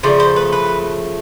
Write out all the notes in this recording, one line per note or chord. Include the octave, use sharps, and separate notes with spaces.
C#3 F3 A3 D5
C5
B4
B4